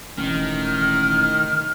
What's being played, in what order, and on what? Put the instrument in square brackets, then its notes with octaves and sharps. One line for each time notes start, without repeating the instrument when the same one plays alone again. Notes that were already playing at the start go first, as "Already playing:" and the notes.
[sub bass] E1 [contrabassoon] A1 [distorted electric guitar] D#3 [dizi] F6